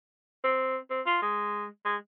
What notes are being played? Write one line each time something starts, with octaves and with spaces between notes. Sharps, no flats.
C4
C4
F4
G#3
G#3